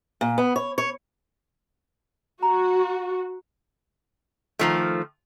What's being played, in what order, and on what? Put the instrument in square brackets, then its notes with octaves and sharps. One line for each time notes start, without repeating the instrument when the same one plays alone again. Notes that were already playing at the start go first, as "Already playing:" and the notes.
[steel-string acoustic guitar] A#2
B3
C#5
C#5
[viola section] F#4 [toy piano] A#5
[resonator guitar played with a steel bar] D#3 F3 A3